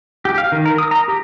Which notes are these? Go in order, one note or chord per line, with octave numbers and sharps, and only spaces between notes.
G4
F5
D#3
A#4
D#6
A#5
G4